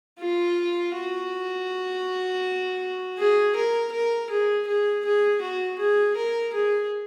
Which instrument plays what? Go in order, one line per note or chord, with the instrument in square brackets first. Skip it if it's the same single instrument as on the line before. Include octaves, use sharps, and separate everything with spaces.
[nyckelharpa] F4
F#4
G#4
A#4
A#4
G#4
G#4
G#4
F#4
G#4
A#4
G#4